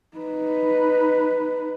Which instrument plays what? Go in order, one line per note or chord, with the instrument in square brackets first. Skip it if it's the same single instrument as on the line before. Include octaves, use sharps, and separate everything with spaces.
[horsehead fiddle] D#4 B4